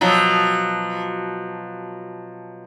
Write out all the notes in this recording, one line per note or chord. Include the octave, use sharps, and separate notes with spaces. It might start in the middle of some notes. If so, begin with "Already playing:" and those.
B2 F3 F#3